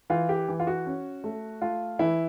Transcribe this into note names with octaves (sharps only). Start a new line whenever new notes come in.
E3 F4
G4
E3
F4
F#4
C#4
A3
A3 F4
E3 E4